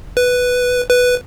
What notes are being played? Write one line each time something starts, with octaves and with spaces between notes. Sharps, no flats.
B4
B4